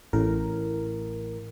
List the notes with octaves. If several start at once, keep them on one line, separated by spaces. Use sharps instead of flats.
A1 A2 A#4